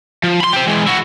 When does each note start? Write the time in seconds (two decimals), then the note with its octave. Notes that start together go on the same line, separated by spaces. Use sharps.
0.24 F3
0.41 B5 C6
0.53 G4 C5
0.67 E3 G#3
0.87 E4 F#4